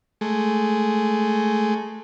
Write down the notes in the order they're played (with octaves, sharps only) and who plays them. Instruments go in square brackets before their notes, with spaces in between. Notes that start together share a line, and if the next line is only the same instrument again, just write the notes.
[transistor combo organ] G#3 A3